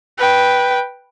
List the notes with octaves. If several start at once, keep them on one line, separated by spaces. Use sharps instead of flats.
B4 G5